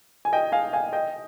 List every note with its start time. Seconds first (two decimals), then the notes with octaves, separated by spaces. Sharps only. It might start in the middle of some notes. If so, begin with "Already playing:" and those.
0.25 G#5
0.33 D#5 G5
0.52 F5 G#5
0.73 F5 G#5
0.93 D#5 G5